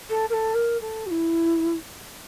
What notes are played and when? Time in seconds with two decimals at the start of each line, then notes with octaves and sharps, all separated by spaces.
0.10 A4
0.30 A#4
0.33 A4
0.54 A#4
0.81 A4
1.06 F#4
1.11 E4